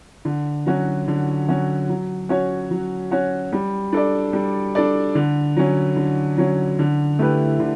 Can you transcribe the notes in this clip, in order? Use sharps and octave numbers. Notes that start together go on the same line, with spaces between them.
D3
F#3 C#4 F#4
D3
F#3 C#4 F#4
F#3
C#4 F#4 C#5
F#3
C#4 F#4 C#5
G3
D4 A4 D5
G3
D4 A4 D5
D3
F#3 C#4
D3
F#3 C#4
D3
A3 E4 G4 B4
D3